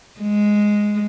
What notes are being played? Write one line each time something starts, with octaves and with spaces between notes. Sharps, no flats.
G#3